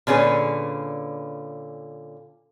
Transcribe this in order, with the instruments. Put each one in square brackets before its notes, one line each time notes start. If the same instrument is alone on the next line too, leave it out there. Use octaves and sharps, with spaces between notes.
[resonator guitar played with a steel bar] A#2 D3 C#4 G#4 B4